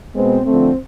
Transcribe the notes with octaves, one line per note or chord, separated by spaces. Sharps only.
B2 G#3 B3 C4
D3 F3 A3 C4